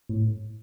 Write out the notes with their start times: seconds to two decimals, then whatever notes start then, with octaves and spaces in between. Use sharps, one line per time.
0.09 A2